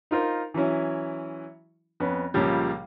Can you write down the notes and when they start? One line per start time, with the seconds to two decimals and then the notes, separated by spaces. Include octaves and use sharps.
0.11 D#4 F4 A#4 C5
0.54 E3 F#3 C#4 E4
2.00 F2 B3 C#4
2.34 C#2 A#2 C#3 F3 G3